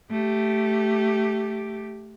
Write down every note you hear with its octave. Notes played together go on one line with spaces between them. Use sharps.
A3 G4